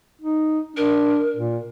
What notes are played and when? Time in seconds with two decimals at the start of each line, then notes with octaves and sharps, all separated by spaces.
0.21 D#4
0.77 D4 A#4
1.37 A#2